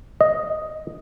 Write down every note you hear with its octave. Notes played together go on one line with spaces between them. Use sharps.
D#5